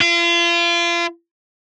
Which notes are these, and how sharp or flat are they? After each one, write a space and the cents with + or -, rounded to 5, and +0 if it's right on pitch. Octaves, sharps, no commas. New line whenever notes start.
F4 -35